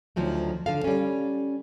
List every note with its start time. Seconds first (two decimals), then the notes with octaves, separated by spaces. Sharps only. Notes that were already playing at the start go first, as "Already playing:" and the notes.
0.16 D2 D#3 F3 F#3 A3
0.66 D3 A4 F5
0.84 G3 C#4